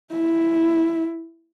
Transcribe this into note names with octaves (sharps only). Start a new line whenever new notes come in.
E4